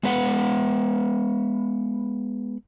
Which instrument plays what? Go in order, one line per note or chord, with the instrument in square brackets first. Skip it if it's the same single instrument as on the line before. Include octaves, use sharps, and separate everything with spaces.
[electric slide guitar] G#3 B3 B4 F#5